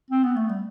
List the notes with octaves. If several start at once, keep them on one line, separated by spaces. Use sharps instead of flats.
C4
B3
A3
G3